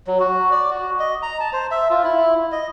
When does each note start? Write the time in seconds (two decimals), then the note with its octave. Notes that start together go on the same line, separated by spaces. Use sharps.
0.07 F#3
0.20 F#4
0.51 D5
0.70 F#4
0.99 D#5
1.23 A#5
1.40 A5
1.53 C5
1.71 E5
1.90 F4
2.04 E4
2.52 D#5